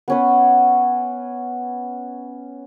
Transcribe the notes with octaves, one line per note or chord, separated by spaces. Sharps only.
B3 C#4 B4